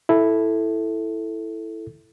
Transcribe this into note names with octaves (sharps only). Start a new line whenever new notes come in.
E4 A4